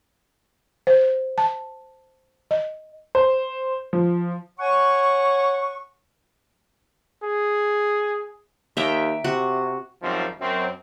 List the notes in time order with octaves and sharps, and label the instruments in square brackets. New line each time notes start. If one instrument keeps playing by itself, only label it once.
[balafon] C5
A5
D#5
[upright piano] C5
F3
[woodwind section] C#5 F#5 G#5 C#6
[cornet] G#4
[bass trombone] D#2 [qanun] E5 G5 A#5
[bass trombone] C3 [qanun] F#4
[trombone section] G#1 F#2 D#3 F3 G3 C4
F#2 C4